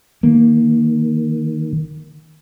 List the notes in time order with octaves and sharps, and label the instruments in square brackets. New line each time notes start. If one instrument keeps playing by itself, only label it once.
[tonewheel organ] D#3 [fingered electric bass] A#3